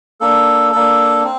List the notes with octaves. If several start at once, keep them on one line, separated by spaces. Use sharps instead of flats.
A#3 D4 A4
A#3 D4 A4
C4